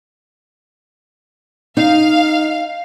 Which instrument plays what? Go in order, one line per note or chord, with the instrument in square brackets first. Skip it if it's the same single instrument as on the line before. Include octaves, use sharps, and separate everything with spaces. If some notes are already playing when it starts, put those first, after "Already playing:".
[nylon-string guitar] D#4 [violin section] F5